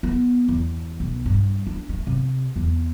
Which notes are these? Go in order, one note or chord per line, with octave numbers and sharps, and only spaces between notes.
B3
E2
B1
G2
D4
A3
C3
E2